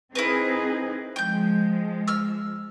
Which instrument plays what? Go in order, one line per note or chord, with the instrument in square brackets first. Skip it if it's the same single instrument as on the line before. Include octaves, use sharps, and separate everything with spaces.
[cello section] C4 D#4 G#4 [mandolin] E4 A#4 B4
[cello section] F3 G#3 [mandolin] G5 G6
[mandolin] E6 F6